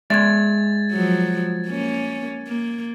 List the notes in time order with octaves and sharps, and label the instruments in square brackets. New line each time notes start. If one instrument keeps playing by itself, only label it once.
[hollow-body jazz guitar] G#3 D5 E5 [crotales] G#6 A6
[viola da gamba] F3 F#3
A#3 C#4
A#3